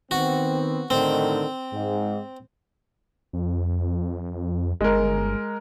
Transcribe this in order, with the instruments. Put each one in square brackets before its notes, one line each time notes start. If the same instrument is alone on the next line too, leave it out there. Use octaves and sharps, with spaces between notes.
[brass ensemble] D#3 B3 C4 [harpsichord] F#4
[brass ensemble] A2 D3 D#3 [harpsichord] C4
[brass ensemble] G#2
[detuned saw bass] F2
[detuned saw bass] G1 [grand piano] G#3 A#4